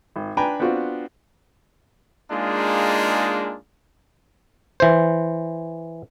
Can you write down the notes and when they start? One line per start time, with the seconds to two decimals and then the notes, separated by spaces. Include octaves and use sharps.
0.16 G#1
0.37 D4 B4 G5 G#5 A#5 B5
0.60 B3 C4 D4 F4 F#4
2.31 G#3 A#3 D4 D#4 F4 G#4
4.80 E3 C5